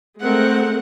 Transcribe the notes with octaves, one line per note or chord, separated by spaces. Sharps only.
G#3 A3 C4 A#4 F#5